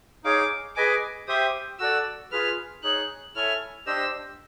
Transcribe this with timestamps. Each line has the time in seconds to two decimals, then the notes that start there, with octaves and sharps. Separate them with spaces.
0.24 D#4 G#4 C#5 F5 D6
0.76 G#4 B4 D#5 G#5 D6
1.28 G4 C5 E5 G5 D#6
1.80 F#4 A4 D5 E6
2.32 F4 G#4 B4 F6
2.83 D#4 G#4 C#5 F#6
3.35 E4 A4 C#5 E5 G#5 F6
3.86 D4 G4 C5 D#5 E6